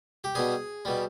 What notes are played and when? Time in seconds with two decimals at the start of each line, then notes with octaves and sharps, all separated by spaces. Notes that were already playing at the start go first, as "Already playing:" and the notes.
0.24 G4
0.35 B2 G3 G#4
0.85 B2 G3